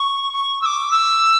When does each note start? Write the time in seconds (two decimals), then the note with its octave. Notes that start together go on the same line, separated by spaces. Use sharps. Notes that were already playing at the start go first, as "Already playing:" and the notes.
Already playing: C#6
0.33 C#6
0.62 E6
0.66 D6
0.91 E6